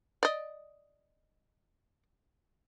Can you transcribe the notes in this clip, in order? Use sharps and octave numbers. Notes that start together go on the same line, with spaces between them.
D5 D#5